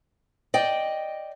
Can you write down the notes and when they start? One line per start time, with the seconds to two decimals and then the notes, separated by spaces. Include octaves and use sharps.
0.54 D5 D#5 G5